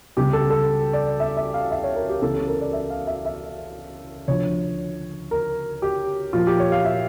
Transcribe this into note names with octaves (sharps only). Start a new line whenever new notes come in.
C#2 C#3 G3 G4
A4
A4
D5
E5
E5
F5
E5
C#5
A#4
G4
C#2 C#3 E3 A4
A#4
D5
E5
F5
E5
E5
D2 D3 F3 C#5
A#4
G4
A#2 F3 A#3 F4
G4
C#5
F5
E5